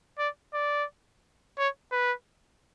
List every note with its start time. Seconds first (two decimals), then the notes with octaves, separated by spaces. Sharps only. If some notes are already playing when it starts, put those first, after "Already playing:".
0.18 D5
0.53 D5
1.58 C#5
1.92 B4